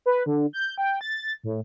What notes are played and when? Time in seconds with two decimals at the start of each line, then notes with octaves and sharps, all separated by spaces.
0.06 B4
0.26 D3
0.53 G6
0.78 G5
1.01 A6
1.44 A2